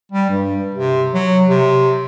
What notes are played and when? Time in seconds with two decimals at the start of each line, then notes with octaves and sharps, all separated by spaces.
0.12 G3
0.30 G2
0.75 C3
1.14 F#3
1.49 C3